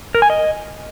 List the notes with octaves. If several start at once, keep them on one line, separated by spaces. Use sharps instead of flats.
A#4
G#5
D#5